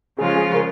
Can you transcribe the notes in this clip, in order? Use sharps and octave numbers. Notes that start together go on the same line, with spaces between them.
C#3 F3 G#3 F4 G#4
G#4
A#4